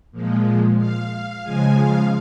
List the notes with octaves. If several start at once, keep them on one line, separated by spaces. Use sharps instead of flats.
A#2 F3 G#3
F5
C#3 F3 G#3 G#5
F5